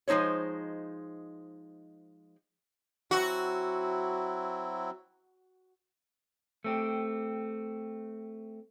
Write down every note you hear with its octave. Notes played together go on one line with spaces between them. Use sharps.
F3 G#3 D#4 C5 C#5
F#3 C4 E4 F#4
A3 C4 G4